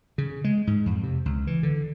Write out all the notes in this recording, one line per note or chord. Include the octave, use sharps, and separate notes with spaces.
C#3
G#3
G#2
F2
C3
C#2
E3
D3